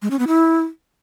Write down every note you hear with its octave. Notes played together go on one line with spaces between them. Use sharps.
G#3
C#4
B3
E4